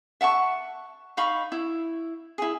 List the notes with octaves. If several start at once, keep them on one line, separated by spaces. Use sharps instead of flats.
E5 F#5 A5 C#6
D#4 F5 B5 C#6
E4
E4 G#4